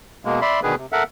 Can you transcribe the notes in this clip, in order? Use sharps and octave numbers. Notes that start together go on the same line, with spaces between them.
B2 G#3 A#3
D5 E5 B5 C6
B2 D3 D#3 G#4 B4
C3
A4 A#4 E5 F#5